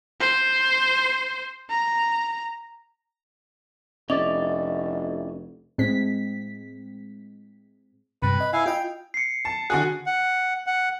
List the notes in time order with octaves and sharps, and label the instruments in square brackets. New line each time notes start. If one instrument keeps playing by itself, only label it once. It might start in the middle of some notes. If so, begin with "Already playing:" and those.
[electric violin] C5
A#5
[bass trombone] F1 [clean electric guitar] C#4 E4 D5 [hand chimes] D#5
[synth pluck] A2 G#3 C4 B6
[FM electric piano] G2 C3 [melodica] B4 B5
[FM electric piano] D#5
[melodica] E4 F5 G#5
[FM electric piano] F4 D#5 [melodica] G5
[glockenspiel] C7 C#7
[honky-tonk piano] A5
[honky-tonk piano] D3 F#4 G#4 [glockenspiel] F#6
[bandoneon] F#5
F#5